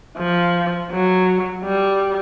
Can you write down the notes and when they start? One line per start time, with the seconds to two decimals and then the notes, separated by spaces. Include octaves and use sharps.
0.18 F3
0.91 F#3
1.64 G3